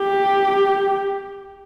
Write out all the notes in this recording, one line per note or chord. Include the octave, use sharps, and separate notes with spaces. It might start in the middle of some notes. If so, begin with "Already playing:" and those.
Already playing: G4